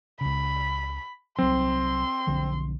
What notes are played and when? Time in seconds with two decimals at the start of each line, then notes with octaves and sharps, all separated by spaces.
0.21 C#2 C#3 B5
1.39 C2 F#3 C4 C6
2.27 B1 D3 F3